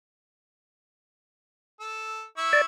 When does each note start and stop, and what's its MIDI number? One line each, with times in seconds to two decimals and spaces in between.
1.80 2.23 69
2.37 2.65 64
2.37 2.65 85
2.37 2.65 88
2.53 2.61 74